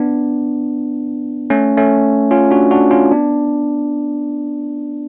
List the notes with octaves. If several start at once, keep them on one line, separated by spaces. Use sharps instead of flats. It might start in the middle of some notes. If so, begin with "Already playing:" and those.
Already playing: B3 D4
A3 C#4
A3 C#4
C#4 F4
D4 F#4
D4 F#4
C#4 F4
B3 D4